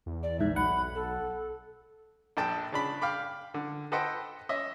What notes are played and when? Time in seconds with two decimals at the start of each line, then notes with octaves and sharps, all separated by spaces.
0.06 E2
0.23 D5
0.39 A#1 G#2 E5
0.56 B1 F#5 B5
0.95 A4
2.37 A#1 D4 A4 G5 A5
2.72 C#3 D4 B5
3.02 F5 G5 B5 D6
3.54 D3
3.92 A4 B4 C5 D#5 F#5 G5
4.49 C#4 D#5 E5